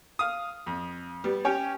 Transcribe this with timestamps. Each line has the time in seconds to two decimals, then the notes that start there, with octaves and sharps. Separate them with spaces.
0.19 F5 D#6
0.66 F2
1.24 G3 B3
1.45 C#4 G4 C#5